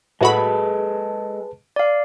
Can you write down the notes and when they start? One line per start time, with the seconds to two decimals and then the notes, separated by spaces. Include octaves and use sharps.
0.21 A2 G#3 F#4 G#4 A4 B4 A5 B5
1.76 D5 F5